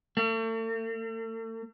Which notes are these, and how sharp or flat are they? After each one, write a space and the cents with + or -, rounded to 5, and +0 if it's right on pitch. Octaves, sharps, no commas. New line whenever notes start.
A3 +40